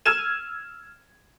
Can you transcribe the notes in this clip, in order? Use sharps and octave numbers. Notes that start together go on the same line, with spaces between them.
E6 F6 G#6 D#7 E7